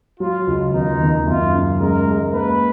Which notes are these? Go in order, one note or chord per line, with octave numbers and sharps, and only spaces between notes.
F#3 F4
C#2
D#2 D#4
D#2
F#2 F4
C#3
G#3 A#4
G#3
A#3 B4